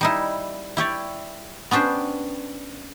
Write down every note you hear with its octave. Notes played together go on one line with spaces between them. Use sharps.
G3 D#4 E4
E4 G4 C#5 D5
B3 C#4 D4 G4 C5